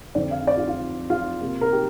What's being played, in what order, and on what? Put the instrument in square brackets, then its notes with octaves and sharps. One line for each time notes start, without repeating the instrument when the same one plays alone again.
[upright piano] F2 D3 F3 C4 D5
F5
D5
F4
F4
F4
C3 A#3
A#4
G4